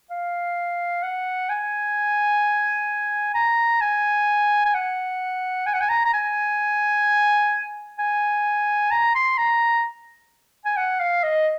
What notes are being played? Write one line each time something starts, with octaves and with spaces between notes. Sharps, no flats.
F5
F#5
G#5
A#5
G#5
G#5
F#5
G#5
F#5
G#5
A#5
A#5
G#5
G#5
A#5
C6
A#5
G#5
F#5
F5
D#5